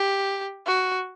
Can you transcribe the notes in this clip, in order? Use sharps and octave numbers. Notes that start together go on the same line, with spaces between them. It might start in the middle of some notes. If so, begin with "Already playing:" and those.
Already playing: G4
F#4